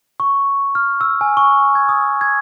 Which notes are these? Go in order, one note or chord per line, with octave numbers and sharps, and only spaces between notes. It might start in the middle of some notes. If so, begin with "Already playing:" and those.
C#6
F6
E6
G#5
C#6
G#6
D#6
G#6